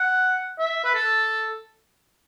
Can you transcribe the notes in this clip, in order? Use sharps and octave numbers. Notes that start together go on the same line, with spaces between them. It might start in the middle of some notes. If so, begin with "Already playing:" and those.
Already playing: F#5
E5
B4
A4